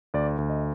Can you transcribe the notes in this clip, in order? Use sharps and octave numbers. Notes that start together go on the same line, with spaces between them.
D2 D5
D2
D#5